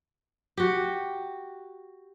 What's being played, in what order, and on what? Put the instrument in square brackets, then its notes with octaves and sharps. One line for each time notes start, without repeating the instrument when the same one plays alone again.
[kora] F#4 G4